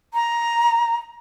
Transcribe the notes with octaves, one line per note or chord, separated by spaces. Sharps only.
A#5